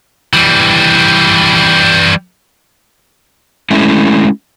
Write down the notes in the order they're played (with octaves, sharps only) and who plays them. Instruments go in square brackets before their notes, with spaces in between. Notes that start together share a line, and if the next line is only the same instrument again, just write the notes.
[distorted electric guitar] E3 G3
[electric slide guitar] G#3 A3 C#4 E4